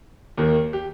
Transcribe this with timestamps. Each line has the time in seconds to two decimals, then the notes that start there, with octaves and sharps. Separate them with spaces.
0.37 D#2 D#3 A#3
0.73 G4